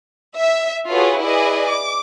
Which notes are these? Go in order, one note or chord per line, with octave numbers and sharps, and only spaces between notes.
E5
F4 F#4 G#4 A4 B4 C#5
E4 G#4 B4 D5 D#5 G#5
D6